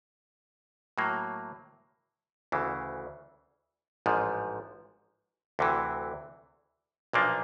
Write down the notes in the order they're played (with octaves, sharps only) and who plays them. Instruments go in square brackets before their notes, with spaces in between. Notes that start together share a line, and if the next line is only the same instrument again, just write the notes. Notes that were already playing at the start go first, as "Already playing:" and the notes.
[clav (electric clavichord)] A2 F#3 A#3
D2 C#3 E3
A1 G#2 F3
D2 C3 E3
B1 A#2 F3 A#3 D4